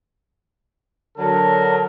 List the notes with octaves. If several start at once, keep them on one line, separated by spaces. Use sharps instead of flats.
D3 F#3 A#4 A5